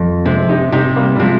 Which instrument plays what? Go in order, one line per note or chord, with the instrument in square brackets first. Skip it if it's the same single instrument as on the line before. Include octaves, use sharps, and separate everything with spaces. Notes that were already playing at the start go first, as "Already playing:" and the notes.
Already playing: [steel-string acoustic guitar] F2
[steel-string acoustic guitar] C3 [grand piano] G#3 C4
[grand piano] D#4 G4
[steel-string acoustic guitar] C3 [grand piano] D#4 G4
[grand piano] G3 A#3
G3
[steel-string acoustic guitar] C3 [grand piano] F3 G#3